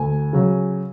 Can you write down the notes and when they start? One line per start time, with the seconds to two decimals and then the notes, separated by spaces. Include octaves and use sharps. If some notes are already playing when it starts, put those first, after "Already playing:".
Already playing: D2 G#5
0.33 C#3 F#3